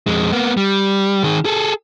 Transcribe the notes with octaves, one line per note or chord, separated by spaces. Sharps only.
F2 G#3
A#3 B3
G3
D#3 G#4
G#4 A4